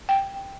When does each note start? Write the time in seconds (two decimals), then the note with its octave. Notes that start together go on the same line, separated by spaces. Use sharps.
0.09 G5